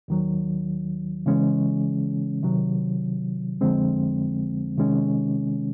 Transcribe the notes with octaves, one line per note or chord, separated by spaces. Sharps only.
D#2 D#3 F#3
C#3 E3 G#3 C#4
C3 D#3 F#3
F2 D3 F3 G#3 C4
C3 D#3 G#3 C#4